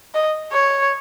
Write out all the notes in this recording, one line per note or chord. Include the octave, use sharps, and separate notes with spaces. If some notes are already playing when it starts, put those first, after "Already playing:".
D#5
C#5